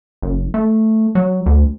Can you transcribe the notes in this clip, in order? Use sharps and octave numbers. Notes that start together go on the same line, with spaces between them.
F#1
A3
F#3
D2